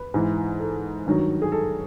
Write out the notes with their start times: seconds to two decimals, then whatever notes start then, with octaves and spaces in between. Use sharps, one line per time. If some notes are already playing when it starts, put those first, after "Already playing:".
Already playing: B4
0.14 G#2 E3
0.60 A4
1.06 G2 D#3 F#3
1.42 G#4
1.52 A4